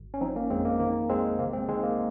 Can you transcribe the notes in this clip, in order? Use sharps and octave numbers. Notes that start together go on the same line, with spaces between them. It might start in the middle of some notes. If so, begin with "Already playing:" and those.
Already playing: G#1
C#4
F3 C4 D#4
A#3 C#4
F2 G#3 C4
A#3
D#3 A#3
A#1 G#3 C4
C3 A#3
G#3 C4
D#3 G#3 C4
A#3